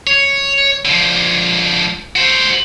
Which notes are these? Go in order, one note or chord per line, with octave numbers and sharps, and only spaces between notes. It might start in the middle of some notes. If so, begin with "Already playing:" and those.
C#5
D3 F3
F#4 C5